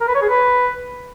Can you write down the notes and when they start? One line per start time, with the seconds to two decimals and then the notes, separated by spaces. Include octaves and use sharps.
0.01 A#4
0.08 B4
0.15 C#5
0.22 G#4
0.29 B4